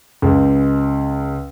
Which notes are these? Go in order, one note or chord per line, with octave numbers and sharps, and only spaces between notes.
C#2